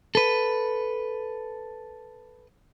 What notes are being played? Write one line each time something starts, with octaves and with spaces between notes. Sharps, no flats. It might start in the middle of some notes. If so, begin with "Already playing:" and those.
A4 B4